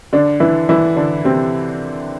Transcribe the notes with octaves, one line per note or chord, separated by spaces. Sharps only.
D3 D4
E3 E4
E3 E4
D3 D4
C3 C4